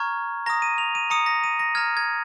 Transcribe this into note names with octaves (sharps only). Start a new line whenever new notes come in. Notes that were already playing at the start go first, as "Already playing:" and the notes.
Already playing: A#5 C#6 F6 G#6
A#5 D#6 A#6
D#7
F7
D#7
A#5 D#6 C#7
A#6
D#7
A#6
A#5 F6 G#6
G#6